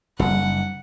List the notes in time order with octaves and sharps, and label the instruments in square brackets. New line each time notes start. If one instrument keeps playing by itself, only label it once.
[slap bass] F#1 [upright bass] G3 D#4 [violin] F#5